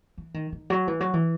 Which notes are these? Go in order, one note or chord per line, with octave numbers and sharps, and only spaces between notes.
E3
D#3
D#3
F#3
E3
F#3
E3